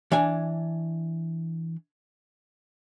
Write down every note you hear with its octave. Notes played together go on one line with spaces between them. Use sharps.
E3 D4 G#5